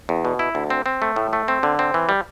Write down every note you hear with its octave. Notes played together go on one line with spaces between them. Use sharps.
E2
B2
E4
D2
C4
C4
A3
A2
A3
C4
D3
C4
E3
G3